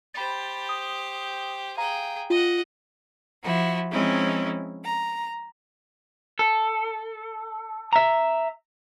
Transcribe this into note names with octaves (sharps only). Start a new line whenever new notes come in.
G4 C5 B5 A6
D#6
G#4 F5 G5 A#5
F4 D#5 F#5
F3 E4 F#4
F3 G#3 C4 C#4 D#4 E4
A#5
A4
E5 A#5